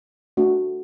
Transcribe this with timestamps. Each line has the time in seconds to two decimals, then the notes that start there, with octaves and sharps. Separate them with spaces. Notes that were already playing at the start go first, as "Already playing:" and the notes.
0.37 A3 D4 F#4